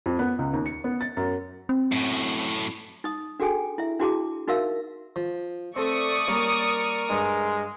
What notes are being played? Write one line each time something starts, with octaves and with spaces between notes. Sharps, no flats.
F2
B3
C#2
D#2
C#7
B3
A6
F#2
C4
F#2 A2
D#4 D#6
D4 F#4 G#4 A4 G5 G#5
E4 E5
D4 E4 F#4 G#4 A5 D6
D#4 F#4 A#4 E5 F5 E6
F3
A3 C4 A4 D5 C#6 D#6
G3 A#3 C#4 A#4
G2 G#3